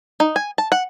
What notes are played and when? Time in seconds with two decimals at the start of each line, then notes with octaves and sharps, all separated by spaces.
0.20 D#4
0.36 G#5
0.58 A5
0.72 F#5